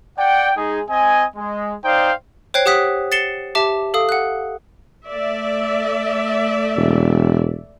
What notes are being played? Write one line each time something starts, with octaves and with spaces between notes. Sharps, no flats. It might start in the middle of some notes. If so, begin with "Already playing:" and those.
D5 F#5 G5
G#3 D#4 G#4
C4 D#5 G#5
G#3
D#4 C5 D5 F5 G5
C5 C#5 G5 F#6 G#6 C7
G4 F#5 D#6 F#6 B6
A6 C7 C#7 E7 G7
G4 E5 A5 D6
A4 F5 D#6
F#5 F#6
A3 D5 E5
E1